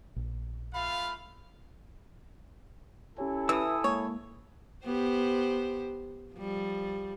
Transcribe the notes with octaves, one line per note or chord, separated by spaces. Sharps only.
A#1
A3 F4 F5 B5
C#4 E4 G4 A4 C#5 G#5
E3 D#6 E6
G#3 A#3 C#5
B3 G4 C5
F3 G3